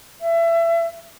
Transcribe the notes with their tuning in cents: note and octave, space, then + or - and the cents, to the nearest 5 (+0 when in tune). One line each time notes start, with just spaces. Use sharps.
E5 +25